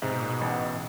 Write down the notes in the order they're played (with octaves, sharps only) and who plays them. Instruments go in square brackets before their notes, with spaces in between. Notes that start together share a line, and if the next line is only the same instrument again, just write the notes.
[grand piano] G#2 [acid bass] C3
[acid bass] B2
A#2
B2
[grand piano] A1